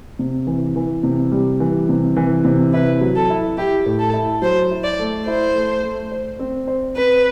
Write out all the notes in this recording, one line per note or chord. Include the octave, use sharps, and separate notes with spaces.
C3
E3
E3
C3
G3
E3
C3
E3
C3
E4 B4
F#3
A4
E4
E4 G4
A2
A4
E4
F#3 C5
E4
D5
A3
E4 C5
A3
A3
C5
C4
C5
C4 B4